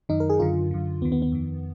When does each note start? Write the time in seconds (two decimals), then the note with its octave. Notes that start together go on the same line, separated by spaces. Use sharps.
0.09 F#2 D#3 D#4
0.20 A#4
0.30 G#4
0.40 F#2 D3 F4
0.71 F#2 D3
1.01 D#2 B3
1.05 D#3
1.12 B3
1.22 B3
1.32 F2 D#3